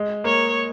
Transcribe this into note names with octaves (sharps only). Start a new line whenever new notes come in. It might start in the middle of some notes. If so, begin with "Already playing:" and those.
Already playing: G#3
A#3 C#5